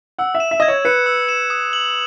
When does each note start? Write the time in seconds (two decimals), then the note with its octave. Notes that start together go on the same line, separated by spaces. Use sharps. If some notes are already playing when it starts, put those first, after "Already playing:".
0.19 F#5 E6
0.35 E5
0.40 E7
0.51 E5
0.60 D#5 G#6
0.68 C#5
0.85 B4 C#7
1.06 E6
1.29 E7
1.50 D#6
1.73 F#7